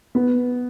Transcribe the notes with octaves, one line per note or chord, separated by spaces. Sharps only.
B3